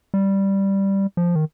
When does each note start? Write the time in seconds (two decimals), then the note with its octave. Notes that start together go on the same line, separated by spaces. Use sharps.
0.14 G3
1.17 F3
1.35 D#3